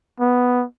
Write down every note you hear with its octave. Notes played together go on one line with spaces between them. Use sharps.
B3